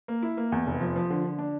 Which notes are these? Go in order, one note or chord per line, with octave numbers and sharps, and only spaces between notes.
A#3
E4
A#3
E2
F1
F3
F3
D3
D3
D4